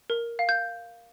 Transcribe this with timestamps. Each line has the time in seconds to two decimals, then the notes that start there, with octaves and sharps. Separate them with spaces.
0.10 A#4
0.39 F5
0.49 G6